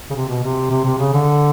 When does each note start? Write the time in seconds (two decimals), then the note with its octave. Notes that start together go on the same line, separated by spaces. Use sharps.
0.10 C#3
0.15 C3
0.28 B2
0.44 C3
0.71 C3
0.85 C3
0.99 C#3
1.13 D3